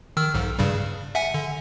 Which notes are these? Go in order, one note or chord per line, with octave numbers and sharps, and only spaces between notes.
D#3 E6 F6
B1 G#2
G2 C#3 G3
E5 F#5 G#5
D3